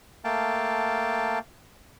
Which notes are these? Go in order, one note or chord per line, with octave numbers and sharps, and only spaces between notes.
A3 A#3 F5 G5 A5